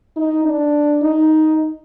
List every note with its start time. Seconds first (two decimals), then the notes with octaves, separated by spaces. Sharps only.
0.16 D#4
0.45 D4
1.02 D#4